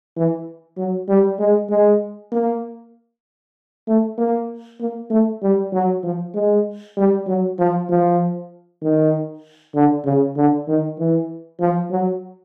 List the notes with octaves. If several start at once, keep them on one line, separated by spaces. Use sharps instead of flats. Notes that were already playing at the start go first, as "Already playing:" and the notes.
E3
F#3
G3
G#3
G#3
A#3
A3
A#3
A#3
A3
G3
F#3
F3
G#3
G3
F#3
F3
F3
D#3
D3
C#3
D3
D#3
E3
F3
F#3